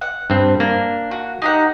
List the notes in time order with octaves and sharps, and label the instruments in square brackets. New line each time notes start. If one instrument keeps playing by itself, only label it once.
[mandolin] F#5
[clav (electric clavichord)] G2 C4
[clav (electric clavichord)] A#3 [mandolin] D4
[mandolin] F#4
D#4 G4 F#5